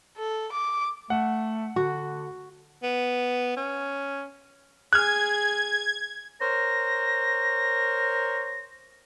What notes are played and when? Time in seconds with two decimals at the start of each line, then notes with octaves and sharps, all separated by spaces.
0.17 A4
0.52 D6
1.10 A3 F#5
1.76 D3 F#4
2.83 B3
3.57 C#4
4.93 G#4 G#5 F6 F#6 G#6
6.40 A#4 C5 C#5 A#6